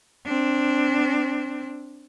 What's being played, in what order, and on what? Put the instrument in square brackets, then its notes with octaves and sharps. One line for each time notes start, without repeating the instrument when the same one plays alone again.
[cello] C4 D4